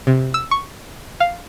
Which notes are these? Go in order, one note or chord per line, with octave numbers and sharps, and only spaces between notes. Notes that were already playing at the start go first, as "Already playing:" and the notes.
C3
E6
C#6
F5